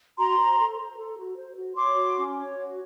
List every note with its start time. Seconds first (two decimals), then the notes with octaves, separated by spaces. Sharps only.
0.18 F#4 A#5 C6
0.37 C5
0.57 A4
0.78 C5
0.97 A4
1.17 F#4
1.36 C5
1.56 F#4
1.75 C#5 C6 D6
1.95 F#4
2.16 C#4
2.36 C#5
2.55 F#4